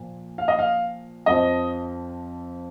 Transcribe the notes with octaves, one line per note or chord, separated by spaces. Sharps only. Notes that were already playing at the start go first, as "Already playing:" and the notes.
Already playing: A#2 F3
F5
D#5
F5
F2 F3 D#5